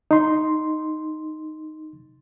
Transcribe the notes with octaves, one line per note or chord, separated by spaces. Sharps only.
D#4 C6